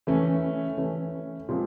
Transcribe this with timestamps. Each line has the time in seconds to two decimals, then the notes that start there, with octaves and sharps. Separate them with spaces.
0.07 E3 A3 C#4
0.77 E3 A3 C#4
1.49 A#2 F3 G#3 C4 F4